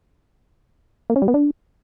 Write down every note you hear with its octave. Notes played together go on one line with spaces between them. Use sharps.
A#3
C#4
G3
B3
D4